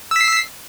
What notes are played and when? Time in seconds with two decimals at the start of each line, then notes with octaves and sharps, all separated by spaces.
0.11 E6
0.16 B6
0.21 C7